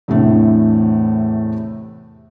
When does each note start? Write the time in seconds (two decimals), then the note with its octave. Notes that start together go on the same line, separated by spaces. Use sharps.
0.08 E2 A2 C3 A3 D4